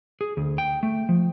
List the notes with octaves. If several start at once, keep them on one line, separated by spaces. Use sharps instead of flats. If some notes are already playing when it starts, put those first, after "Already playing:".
G#4
D2
G5
A3
F3